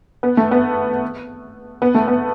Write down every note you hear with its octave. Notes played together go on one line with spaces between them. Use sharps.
B3
A3
B3
B3
A3
B3